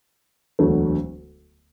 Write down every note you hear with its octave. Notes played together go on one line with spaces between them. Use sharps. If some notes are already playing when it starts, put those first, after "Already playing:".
E1 D2 D3 F#3 A3